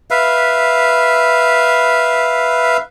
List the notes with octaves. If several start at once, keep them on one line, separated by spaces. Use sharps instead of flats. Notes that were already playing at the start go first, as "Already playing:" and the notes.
B4 E5 F5